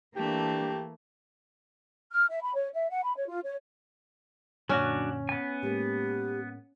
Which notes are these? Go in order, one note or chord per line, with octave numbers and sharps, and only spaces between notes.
E3 A3 A#3 D4 G4
F6
E5
B5
C#5
E5
F#5
B5
C#5
F4
C#5
F#2 A#2 D3 F#3 C#4 D4 F#4
B3 G#5
A2 G#3 A#3 G4